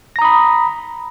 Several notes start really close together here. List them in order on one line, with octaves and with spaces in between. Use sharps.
A#6 A#5 D#6 B5